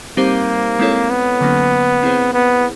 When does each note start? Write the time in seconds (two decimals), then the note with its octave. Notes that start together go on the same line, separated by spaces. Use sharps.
0.17 G3 A#3 C4 D#4 G4 C5
0.79 G#3 C4 E4 A4 C#5
1.10 B3
1.41 D3 F#3 A#3 C#4
2.03 C4 E4 G#4 C5
2.34 B3